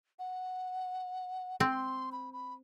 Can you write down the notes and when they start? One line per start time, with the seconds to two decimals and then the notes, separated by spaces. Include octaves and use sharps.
0.19 F#5
1.60 C4 C6
2.12 B5
2.33 B5